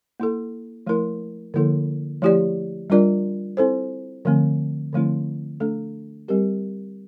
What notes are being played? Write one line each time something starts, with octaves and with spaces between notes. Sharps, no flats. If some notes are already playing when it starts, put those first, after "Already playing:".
A#3 E4 A4
F3 A3 E4 A#4
D3 F3 A#3 E4 A4
F3 A3 E4 G4 D5
G3 D4 F4 A#4 D5
C4 E4 A4 C5
D3 F3 A3 C4
D3 F3 A3 C4 E4
A3 D4 A4
G3 C4 G4 A#4